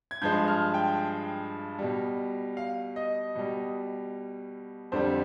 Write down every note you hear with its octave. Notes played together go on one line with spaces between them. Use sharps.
G#6
G2 F3 G#3 G6
F6
G5
B2 G3
F5
D#5
B2 G3
F2 D3 G3 C5